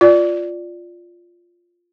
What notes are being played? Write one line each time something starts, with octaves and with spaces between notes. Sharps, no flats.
F4 D5